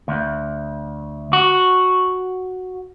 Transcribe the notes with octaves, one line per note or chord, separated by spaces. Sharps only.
D2
F#4